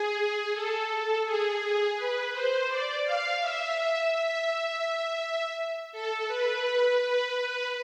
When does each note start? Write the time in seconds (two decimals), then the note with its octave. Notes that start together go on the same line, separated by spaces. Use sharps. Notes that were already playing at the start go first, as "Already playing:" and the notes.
Already playing: G#4
0.53 A4
1.25 G#4
1.97 B4
2.33 C5
2.68 D5
3.05 F5
3.41 E5
4.12 E5
5.92 A4
6.28 B4
7.00 B4